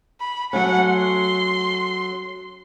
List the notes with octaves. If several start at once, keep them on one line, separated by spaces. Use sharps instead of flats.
B5
F#3 A3 C#4 F#5
C6